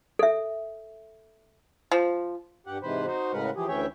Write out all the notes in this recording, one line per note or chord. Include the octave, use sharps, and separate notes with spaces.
A4 E5
F3
G2 G4 F#5
G#2 C3 E3 B4 C5
D#4 F#4 C5
A2 C#3 G#3 A#4 B4 F#5
E3 F3 G4 G#4
D2 E3 C#4 C#5 E5 G5